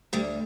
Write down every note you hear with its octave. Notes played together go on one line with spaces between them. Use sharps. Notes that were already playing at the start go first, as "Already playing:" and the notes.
D2 G3